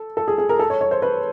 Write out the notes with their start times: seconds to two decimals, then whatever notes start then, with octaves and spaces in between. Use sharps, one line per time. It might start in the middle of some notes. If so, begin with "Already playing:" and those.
Already playing: A4
0.17 A4
0.28 G#4
0.38 G#4
0.49 A#4
0.59 A4
0.70 C#5
0.81 C#5
0.91 C5
1.02 B4